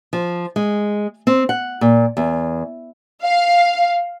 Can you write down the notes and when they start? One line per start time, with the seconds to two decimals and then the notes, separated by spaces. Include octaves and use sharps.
0.13 F3
0.56 G#3
1.27 C4
1.49 F#5
1.81 A#2
2.17 E2
3.23 F5